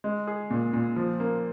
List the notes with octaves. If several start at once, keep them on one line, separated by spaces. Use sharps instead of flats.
G#3
G#4
A#2
A#2
F3
A#3